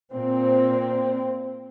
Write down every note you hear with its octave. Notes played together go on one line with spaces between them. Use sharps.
A#2 C4